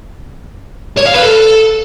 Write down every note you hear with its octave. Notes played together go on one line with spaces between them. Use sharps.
C#5
F5
B4
A4